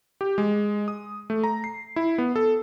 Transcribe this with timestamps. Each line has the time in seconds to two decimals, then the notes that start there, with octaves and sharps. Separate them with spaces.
0.21 G4
0.38 G#3
0.88 D#6
1.30 A3
1.44 A#5
1.64 C7
1.96 E4
2.18 B3
2.36 A4